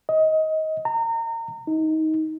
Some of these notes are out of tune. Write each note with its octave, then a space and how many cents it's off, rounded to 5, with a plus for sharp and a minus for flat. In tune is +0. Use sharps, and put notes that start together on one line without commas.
D#5 +20
A#5 -30
D#4 +20